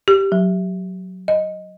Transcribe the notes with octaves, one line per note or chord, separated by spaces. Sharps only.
G4
F#3
D#5